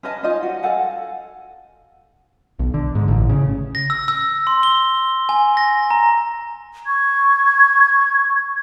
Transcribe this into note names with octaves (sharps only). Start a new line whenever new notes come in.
C#4 B4 D#5 A5
C#4 D#4 F4 D#5
F#4
A4 F5 F#5 G#5
B1
D3
G#2
A1
C#3
A#6
E6
E6
C6
G7
G#5
A#6
A#5
C#6 G#6